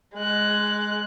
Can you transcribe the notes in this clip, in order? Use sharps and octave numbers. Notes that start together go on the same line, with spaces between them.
G#3 F#6